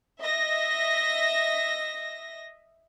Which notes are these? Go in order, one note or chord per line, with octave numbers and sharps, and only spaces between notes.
D#5 E5 A#6